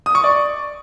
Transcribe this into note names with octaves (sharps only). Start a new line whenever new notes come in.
D#6
C#6
D5